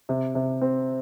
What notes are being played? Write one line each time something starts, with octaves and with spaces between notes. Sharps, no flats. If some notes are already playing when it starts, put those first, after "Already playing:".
C3
C3
C4